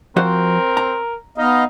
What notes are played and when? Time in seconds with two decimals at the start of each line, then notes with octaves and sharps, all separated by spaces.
0.16 F3 C4 F#4 A#4 C5
0.77 A#5
1.38 B3 D#4 D#5 F5